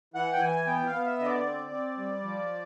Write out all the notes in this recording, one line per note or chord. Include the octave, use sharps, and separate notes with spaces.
E3 F#5
G5
E3 G#5
B3 G5
F5
B3
E5
D3 D#5
D5
C4
C4
G3
F3